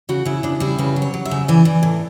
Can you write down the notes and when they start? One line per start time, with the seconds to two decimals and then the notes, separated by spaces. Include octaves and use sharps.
0.09 C#3 F#4
0.25 C#3 E4
0.43 C#3 D4
0.60 G3 E4
0.78 C#3 B4
0.96 F#3
1.02 C#5
1.14 F#3
1.25 E5
1.31 C#3
1.48 E3 D5
1.65 E3
1.83 A2